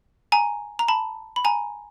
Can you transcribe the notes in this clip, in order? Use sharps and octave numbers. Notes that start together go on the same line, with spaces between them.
G#5 A#5
A#5
A5 B5
B5
G#5 A#5